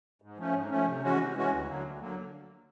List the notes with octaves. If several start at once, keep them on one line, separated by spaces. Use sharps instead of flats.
G#2
F3 A3 C#4
G#2
F3 A3 C#4
C3
E3 G#3 C#4 F#4
C3
E3 G#3 C#4 F#4
D2
D3 F#3 A#3
D2
D3 F#3 A#3